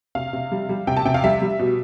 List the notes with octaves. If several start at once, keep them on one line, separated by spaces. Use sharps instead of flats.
C3 F5
C3
G3
G3
C3 G5
A5
C3 G5
F5
G3 E5
G3
B2